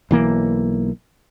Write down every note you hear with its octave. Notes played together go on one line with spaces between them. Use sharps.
B1 E3 A#3